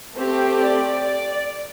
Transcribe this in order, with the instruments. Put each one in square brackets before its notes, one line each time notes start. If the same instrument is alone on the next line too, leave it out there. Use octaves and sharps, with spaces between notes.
[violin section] A3 C4 G4
D5
D5